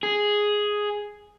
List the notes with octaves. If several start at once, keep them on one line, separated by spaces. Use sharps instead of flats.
G#4